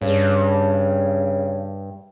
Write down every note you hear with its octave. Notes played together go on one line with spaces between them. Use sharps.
G2 C#3